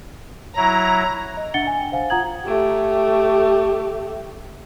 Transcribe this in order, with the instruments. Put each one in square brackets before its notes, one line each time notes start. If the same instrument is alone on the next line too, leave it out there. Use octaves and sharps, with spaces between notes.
[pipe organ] F#3 E4 [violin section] A#5
[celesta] D#5
D4 E5 F#5 A6 C#7 G7
G#5
G5
C5 F5 F#5 G#5
F4 F#5 A#5 D#6 G#6 F#7
[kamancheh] A3 G4